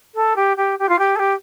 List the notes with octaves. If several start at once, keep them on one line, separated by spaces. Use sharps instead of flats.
A4
G4
G4
G4
F4
G4
A4
G4